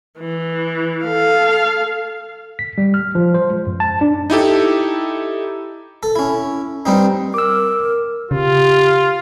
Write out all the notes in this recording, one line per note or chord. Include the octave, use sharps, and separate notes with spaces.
E3
A4 F5
B6
G3
F6
F3
C5
G#3
F#2
A5
D4
D#4 E4 G4 A4
A4
C#4 E4
G2 G3 C4 D#4
A#4 D6 E6
C#3 F4 G4